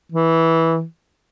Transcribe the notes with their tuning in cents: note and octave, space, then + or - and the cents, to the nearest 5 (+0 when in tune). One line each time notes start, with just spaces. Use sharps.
E3 -10